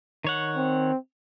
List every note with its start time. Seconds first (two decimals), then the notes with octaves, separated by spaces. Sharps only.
0.24 D#3 C#5 F#5
0.57 C4